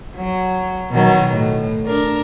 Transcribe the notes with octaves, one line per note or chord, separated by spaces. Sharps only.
F#3
B2 D#3 F#3
A2
D4 A#4